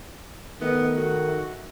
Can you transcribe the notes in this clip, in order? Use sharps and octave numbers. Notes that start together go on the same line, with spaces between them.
D#3 A3 B3 A4 E5
F#4 A4
E5